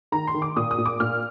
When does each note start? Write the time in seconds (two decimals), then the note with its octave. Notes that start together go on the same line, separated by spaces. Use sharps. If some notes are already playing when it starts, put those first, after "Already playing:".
0.12 D#3 A#5
0.27 C6
0.34 D#3
0.42 D6
0.56 A#2 D#6
0.71 D#6
0.78 A#2
0.86 D6
1.00 A#2 F6